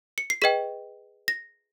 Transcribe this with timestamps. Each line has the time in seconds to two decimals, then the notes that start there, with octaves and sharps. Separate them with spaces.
0.18 C#7
0.30 C7
0.42 G#4 B4 D#5 G5 B6
1.28 A#6